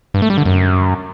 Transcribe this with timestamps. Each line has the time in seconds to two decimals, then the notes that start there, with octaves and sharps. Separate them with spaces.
0.14 G2
0.22 A3
0.30 G3
0.38 D3
0.45 F#2